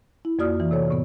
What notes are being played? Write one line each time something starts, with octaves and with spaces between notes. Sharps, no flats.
E4
F2 A#3 F#4 D5 D#6 F6
E3
C3 A4 C#5
A2 C3 B3